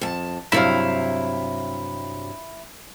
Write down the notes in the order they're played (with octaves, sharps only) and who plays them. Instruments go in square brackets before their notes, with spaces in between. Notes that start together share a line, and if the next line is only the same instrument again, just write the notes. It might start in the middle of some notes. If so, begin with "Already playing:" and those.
[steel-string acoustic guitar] F2 A5
[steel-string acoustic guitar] G2 C3 F#3 [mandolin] E4 F5